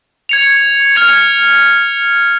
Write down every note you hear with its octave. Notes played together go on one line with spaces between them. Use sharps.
G#6 C#7 F7
F6 G#6 C#7 F7